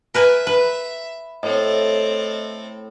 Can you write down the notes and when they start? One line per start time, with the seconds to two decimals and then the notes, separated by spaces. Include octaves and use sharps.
0.14 A#4 B4 E5 G#5
0.47 B4 B5
1.43 A2 C4 A4 D#5